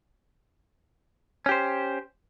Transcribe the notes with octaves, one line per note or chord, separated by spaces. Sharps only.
C#4 G4 C5